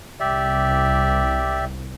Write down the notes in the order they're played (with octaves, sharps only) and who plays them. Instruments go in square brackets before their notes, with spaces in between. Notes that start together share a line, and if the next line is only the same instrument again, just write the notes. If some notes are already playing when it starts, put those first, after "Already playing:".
[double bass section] C2 [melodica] G4 D5 E5